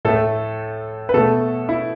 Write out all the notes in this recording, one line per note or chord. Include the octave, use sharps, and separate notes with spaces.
A2 A3 A4
B4
B2 A3 A4
E4